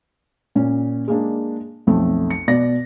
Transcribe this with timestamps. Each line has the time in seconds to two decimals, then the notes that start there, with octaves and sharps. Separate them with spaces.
0.55 A#2 C#4
1.08 G#3 A#3 D4
1.87 B1 F2 A3
2.30 C#7
2.48 B2 D5 A#6